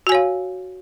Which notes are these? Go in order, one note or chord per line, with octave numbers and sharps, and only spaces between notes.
F#4 C#5 F5 G#5